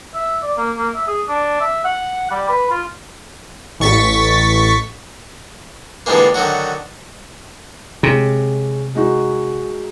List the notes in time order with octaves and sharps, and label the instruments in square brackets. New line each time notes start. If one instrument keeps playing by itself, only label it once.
[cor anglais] E5
D5
A#3
A#3
E5
G#4
D4
E5
F#5
G3
B4
F4
[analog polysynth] A1 C#6 A6 B6
[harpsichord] D3 E3 F3 G3 G#3 A#3
D3 D#3 F#3 F#4
[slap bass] C3 [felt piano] G#3 C#4
[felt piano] G#3 D#4 F#4